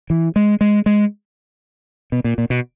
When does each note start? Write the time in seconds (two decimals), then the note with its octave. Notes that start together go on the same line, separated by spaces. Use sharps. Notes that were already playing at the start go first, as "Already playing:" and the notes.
0.10 E3
0.36 G#3
0.61 G#3
0.86 G#3
2.12 B2
2.24 A#2
2.38 A#2
2.50 B2